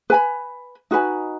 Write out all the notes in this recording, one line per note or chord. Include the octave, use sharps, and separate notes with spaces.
B4 G#5 B5
D#4 F#4 B4 G#5